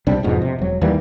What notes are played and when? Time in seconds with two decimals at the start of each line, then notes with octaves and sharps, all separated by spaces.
0.07 C2 C3 G3 D4
0.23 E1 F2 G#2 B2
0.42 C3
0.59 E1 F#3
0.81 D#2 E3 G3 A#3